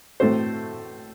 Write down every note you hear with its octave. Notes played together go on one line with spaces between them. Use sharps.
A2 A3 C4 F#4 C5